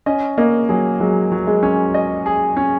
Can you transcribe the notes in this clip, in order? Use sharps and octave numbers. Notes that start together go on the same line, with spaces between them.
C#4 D#5
A#3 D#5
F#3 G#4
F#3 G#3
F#3
G#3
C#4
D#5
G#4
C#4